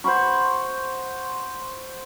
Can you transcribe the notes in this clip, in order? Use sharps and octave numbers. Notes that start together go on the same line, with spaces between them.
C5 F#5 B5 C#6